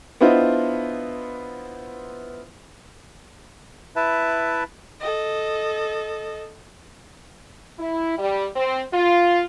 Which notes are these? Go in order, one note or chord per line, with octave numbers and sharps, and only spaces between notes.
B3 D4 E4 F4 C5 D#5
E4 B4 E5 A5
A4 D#5
E4
G3
C4
F4